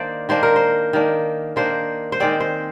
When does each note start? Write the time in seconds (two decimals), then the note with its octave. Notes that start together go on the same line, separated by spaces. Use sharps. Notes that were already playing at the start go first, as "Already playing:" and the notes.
Already playing: D#3 A#3 D4 C5 D5
0.29 D#3 A#3 D4 C5
0.43 A#4
0.56 C5
0.93 D#3 A#3 D4
1.56 D#3 A#3 D4 C5
2.12 C5
2.20 D#3 G#3 C4 D5
2.40 C5